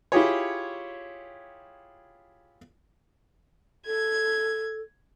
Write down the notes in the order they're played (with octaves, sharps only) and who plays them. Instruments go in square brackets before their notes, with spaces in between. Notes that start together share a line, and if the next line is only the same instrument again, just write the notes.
[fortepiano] E4 F4 G4 G#4 C#5
[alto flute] A4 [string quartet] G#6